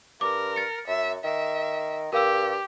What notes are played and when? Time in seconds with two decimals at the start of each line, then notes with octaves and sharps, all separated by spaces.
0.21 G2 A#4 D6
0.56 A6 C#7
0.87 F#2 E5
1.24 D#3 E5
2.13 G2 G4 A#4 F5 E6